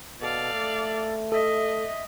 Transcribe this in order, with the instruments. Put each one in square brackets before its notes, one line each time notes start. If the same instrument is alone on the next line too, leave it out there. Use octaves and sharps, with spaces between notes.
[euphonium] B2 [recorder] A4 [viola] D5 F5
[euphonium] A3
[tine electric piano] A4 [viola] D#5 [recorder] E5